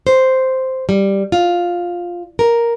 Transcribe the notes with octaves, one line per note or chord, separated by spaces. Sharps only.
C5
G3
F4
A#4